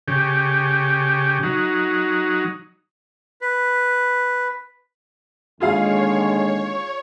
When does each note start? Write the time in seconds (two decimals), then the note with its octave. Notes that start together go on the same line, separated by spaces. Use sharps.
0.08 C#3 G4
1.43 F#3 D#4
3.41 B4
5.60 D#2 D3 G#3 F4 G#4 C#5 F5